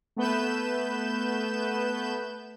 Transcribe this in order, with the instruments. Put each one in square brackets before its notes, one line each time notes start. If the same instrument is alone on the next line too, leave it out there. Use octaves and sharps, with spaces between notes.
[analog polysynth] A3 B3 B4 G6 E7